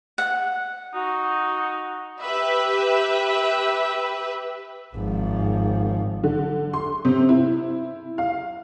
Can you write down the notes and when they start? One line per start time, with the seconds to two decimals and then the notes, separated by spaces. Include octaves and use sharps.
0.18 F#5
0.94 D#4 F#4
2.22 G4 B4 E5
4.95 G#1 F3
6.23 D3
6.73 C6
7.05 C3
7.29 E4
8.18 F5